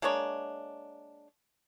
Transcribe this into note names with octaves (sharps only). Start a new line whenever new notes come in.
G#3 A#3 D4 C#5